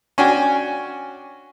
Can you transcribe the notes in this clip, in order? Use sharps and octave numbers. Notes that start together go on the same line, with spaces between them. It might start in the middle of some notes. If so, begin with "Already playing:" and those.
C#4 D4 F#4 G5 G#5